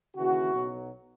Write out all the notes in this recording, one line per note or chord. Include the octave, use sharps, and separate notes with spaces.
D#2 C#3 E3 F#4
B1 B2 F#3